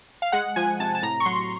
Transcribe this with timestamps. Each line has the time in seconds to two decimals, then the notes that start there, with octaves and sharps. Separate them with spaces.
0.22 F5
0.32 G#3 F#5
0.56 F3 G#5
0.80 C3 A5
0.95 A5
1.02 A2 A#5
1.20 C#6
1.25 F#3 C6